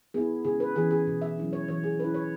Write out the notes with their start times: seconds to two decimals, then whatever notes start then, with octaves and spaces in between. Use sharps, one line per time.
0.14 B3 E4 G#4
0.45 C#3 G#4
0.60 B4
0.76 E3 C#4 G#4
0.91 G#4
1.07 B2
1.22 E5
1.38 F#3 C#4 E4
1.53 C#5
1.69 E3 C#5
1.84 G#4
1.99 C#4 B4
2.04 E4
2.14 C#5